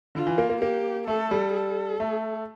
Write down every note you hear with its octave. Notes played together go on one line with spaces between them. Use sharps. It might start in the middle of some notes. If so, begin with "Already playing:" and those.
D3 F4
E3
A#3
A#3
A#3 G4
A3 A4
G3
A4
A3